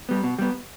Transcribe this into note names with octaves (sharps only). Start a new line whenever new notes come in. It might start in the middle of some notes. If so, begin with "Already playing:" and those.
G3 B3
B2
G3 B3